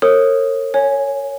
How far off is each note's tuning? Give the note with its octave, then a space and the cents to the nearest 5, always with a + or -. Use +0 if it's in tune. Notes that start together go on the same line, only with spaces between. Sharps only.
A#4 -35 C#5 -35 D#6 +0
C#5 +5 G#5 +0